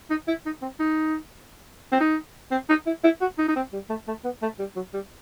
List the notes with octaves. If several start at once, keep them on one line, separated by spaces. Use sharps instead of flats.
D#4
E4
D#4
C4
D#4
C4
D#4
C4
D#4
E4
E4
F#4
D#4
D#4
C4
G3
A3
A3
B3
A3
G3
F#3
G3